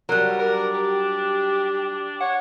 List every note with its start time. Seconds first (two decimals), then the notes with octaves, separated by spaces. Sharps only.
0.09 F#3 G3 A#4
0.39 D4 A#4
0.74 G4
2.20 C#5 F#5